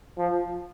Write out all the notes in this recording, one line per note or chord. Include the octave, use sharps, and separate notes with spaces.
F3